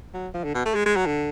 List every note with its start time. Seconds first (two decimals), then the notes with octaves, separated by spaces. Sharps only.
0.14 F#3
0.34 F3
0.44 D3
0.55 B2
0.65 A3
0.75 G#3
0.86 G#3
0.96 F#3
1.06 D3